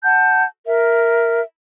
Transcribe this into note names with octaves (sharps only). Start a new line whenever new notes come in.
F#5 A5 G6
A#4 E5